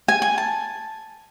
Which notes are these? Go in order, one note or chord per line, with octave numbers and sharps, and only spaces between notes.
G#5
G#5
A5